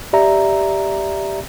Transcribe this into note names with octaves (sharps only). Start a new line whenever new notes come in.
G4 D5 E5 A#5